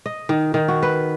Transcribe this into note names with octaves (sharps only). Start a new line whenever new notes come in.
D#5
D#3
D#3
F#4
B4